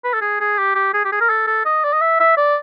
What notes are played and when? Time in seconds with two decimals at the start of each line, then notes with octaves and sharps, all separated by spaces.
0.04 B4
0.14 A4
0.21 G#4
0.40 G#4
0.58 G4
0.75 G4
0.94 G#4
1.05 G4
1.12 G#4
1.21 A#4
1.29 A4
1.47 A4
1.65 D#5
1.84 D5
1.93 D#5
2.01 E5
2.20 E5
2.37 D5